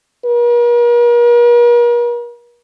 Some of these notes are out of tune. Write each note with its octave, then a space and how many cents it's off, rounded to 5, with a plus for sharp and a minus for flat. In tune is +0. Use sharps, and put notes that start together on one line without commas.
A#4 +45